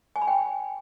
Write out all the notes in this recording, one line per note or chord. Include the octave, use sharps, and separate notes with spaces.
G#5
B5
G5